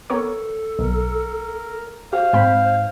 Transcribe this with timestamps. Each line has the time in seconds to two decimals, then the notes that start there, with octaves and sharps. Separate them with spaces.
0.10 B3 A4 A#4 C#5
0.79 B1 A#4
2.13 F#4 C5 F5
2.33 G#2 C4 G5 B5